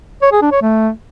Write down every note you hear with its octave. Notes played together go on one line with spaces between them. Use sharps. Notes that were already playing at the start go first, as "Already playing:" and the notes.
C#5
G#4
D4
C#5
A3